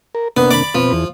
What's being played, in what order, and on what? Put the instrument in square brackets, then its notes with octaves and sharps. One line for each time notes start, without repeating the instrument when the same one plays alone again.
[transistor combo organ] A#4
[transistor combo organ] C3 A#3 D4 [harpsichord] B3
[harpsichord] D5 B5
[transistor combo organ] B2 C4 B4 [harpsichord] F3
[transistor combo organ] E2